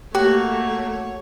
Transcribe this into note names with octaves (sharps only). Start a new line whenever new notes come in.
A3 A#3 F#4 G4 C#5